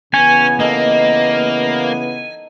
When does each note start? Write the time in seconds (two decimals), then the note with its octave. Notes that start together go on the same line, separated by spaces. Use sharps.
0.14 C#3 E3 B3 C#4 G#5
0.60 A#3 D#4 A4